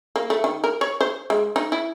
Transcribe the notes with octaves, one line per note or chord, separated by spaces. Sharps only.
A#3
A3
D#3
A#4
C#5
C5
G#3
D#4
E4